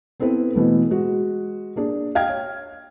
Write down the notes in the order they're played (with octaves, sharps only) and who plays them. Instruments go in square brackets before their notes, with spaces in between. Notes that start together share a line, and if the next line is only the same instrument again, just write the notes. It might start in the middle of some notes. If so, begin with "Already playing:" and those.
[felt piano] B3 C4 E4 A4 B4
B2 E3 A3 B3
G#3 F#4
A#3 D4 G#4
D#5 F5 G5 F6 G#6
C#5